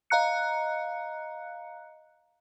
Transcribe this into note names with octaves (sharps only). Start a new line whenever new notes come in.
D#5 F5 A#5 F#6 C#7